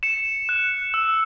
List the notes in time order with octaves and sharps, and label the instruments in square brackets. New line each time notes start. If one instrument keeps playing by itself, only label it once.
[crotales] C#7 E7
F#6
E6